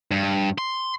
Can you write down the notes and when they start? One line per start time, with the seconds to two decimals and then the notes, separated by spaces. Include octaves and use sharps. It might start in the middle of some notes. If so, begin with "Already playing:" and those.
0.11 G2
0.58 C6